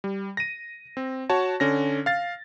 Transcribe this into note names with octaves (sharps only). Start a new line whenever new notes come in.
G3
A#6 D#7
C4
F#4 C#5 A5
D3 C#4 A#6
F5 A6